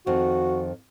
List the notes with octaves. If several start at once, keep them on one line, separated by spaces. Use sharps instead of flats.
F2 D#3 F#4